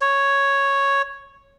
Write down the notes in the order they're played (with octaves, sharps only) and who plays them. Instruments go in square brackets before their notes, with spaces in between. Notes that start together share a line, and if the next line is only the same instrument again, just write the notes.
[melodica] C#5